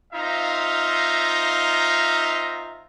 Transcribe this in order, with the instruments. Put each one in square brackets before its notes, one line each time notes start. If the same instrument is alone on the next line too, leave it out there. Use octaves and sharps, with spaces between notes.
[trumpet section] C4 D#4 F4 E5 F5 A#5